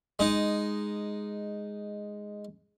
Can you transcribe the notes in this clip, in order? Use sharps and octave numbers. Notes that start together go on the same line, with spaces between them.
G#3 D#4